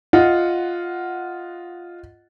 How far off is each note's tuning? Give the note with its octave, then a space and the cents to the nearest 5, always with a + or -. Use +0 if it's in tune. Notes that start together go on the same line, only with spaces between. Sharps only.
F4 +0 D#5 +0 F#5 +0